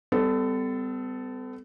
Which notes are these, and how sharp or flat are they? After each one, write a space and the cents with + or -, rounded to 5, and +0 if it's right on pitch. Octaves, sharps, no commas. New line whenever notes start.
G3 +10 B3 +45 A4 +0